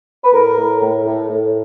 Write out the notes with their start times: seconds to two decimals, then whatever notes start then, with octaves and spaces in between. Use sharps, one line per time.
0.24 B4
0.33 A2 A#4
0.57 A2
0.81 A2
1.05 A2
1.29 A2